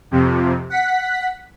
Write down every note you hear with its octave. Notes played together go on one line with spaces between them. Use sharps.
F2 C3
F#5 B6